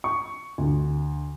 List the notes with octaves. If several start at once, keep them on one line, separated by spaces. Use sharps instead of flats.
C#6
D2